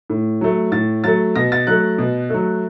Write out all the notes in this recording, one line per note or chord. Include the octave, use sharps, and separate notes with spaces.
A2
F#3 A3
A2 A6
F#3 A3 A6
B2 A#6
A6
F#3 A3 F#6
B2
F#3 A3